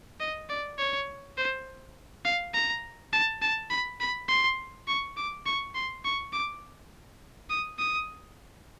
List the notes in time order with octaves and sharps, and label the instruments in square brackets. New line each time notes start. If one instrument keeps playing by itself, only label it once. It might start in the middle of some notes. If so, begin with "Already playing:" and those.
[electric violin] D#5
D5
C#5
C5
F5
A#5
A5
A5
B5
B5
C6
C#6
D6
C#6
C6
C#6
D6
D#6
D#6